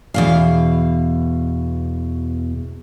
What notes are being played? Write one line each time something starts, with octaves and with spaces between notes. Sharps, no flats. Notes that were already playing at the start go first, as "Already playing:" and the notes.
E2 B2 F5